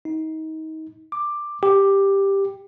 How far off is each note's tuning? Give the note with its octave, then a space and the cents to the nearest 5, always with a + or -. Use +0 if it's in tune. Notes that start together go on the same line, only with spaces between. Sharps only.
D#4 +30
D6 +10
G4 +5